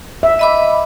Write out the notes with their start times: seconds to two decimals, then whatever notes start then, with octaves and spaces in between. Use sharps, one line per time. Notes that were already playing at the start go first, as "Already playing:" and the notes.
0.23 E5
0.39 D#5 B5 D6